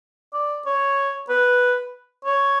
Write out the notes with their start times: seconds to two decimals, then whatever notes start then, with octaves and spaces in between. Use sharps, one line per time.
0.34 D5
0.66 C#5
1.30 B4
2.25 C#5